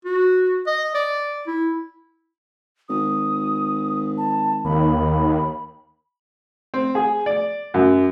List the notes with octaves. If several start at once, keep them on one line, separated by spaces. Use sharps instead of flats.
F#4
D#5
D5
E4
G#1 D#6
A5
D#2 B5
C4
G#4
D5
F#2